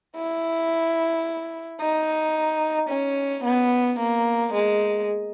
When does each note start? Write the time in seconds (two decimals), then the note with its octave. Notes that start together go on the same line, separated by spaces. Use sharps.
0.16 E4
1.81 D#4
2.89 C#4
3.44 B3
3.99 A#3
4.54 G#3